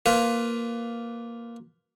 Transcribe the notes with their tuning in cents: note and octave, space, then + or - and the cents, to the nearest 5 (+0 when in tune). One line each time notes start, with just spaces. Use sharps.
A#3 +0 F4 +0 B4 +15